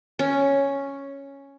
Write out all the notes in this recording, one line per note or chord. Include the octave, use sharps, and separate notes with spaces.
C#4